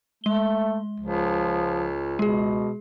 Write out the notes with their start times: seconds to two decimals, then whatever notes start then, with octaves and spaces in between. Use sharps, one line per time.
0.24 G#3 A3 G7
1.00 C#2 F3
2.19 B2 G#3 G#4